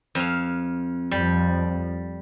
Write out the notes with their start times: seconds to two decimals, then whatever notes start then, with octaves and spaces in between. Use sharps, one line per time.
0.15 F2 F5
1.11 F2 F3 G3